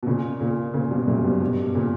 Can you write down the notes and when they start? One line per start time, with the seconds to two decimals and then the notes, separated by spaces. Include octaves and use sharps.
0.03 B2
0.06 A#2 C#3
0.40 A#2 C#3
0.74 A#2 C#3
0.91 G2 B2
1.08 F#2 A#2
1.24 G2 B2
1.41 G2 B2
1.75 A#2 C#3